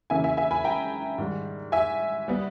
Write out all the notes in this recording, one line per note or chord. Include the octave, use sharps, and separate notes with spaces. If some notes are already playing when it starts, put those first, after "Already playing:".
C#3 E3 A#3 C#4 E5 G#5
E5 G#5
E5 G#5
G#5 B5
G5 A#5
G#2 D#3 G3
E5 G#5
G3 B3